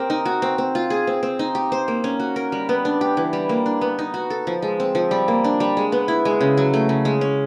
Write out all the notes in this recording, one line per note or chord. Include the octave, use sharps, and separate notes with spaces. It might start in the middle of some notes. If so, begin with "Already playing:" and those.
Already playing: C4 G4 A#4
D#4
F#4
C4
C4
F4
G#4
C4
C4
D#4
G4
C5
A#3
C#4
F#4
A#4
G3
B3
D4
G4
E3
G3
A#3
D4
B3
D#4
F#4
A4
F3
G#3
C4
F3
G3
A#3
D4
G3
G#3
B3
E4
G#3
C#3
F#3
A3
C#3
G#3
C#4